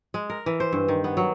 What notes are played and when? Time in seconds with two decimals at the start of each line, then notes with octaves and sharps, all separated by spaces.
0.14 G#3
0.30 A#4
0.46 E3
0.60 C5
0.73 G2
0.88 D#3
1.04 B3
1.17 F#3